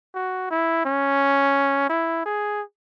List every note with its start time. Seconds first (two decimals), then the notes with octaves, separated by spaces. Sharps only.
0.15 F#4
0.51 E4
0.85 C#4
1.89 E4
2.26 G#4